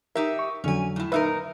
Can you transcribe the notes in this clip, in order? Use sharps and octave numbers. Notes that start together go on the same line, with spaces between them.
D#4 G4 A#4 E5
C#6
F2 D3 F#3 C#4 G#5
A2 E4
A#2 D#4 A#4 B4 E5